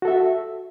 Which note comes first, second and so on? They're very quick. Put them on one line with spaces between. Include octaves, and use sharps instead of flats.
F#4 A4 E5